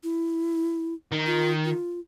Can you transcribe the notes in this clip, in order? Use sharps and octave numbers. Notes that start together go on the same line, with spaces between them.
E4
D#3
F4
F4